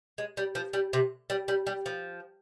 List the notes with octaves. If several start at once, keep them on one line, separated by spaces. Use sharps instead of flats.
G#3
G3
F3
G3
C3
G3
G3
G3
F3